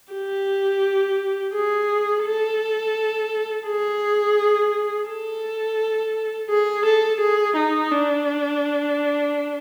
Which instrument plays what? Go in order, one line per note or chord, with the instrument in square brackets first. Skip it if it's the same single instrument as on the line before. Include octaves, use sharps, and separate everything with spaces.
[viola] G4
G#4
A4
G#4
A4
G#4
A4
G#4
D#4
D4